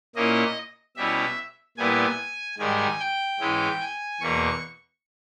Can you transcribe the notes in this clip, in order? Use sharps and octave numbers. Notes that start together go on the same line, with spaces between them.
A#2 A#3 C#4 E4 D#5
B2 G3 C#4 E4 E5
A#2 G3 B3 E4 G#5
G#2 D#3 G3 G#5
G5
G#2 E3 G#3 C#4 E4
G#5
E2 B2 A#3 C#6